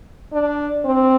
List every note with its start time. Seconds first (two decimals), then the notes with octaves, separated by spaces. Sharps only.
0.32 D4
0.85 C4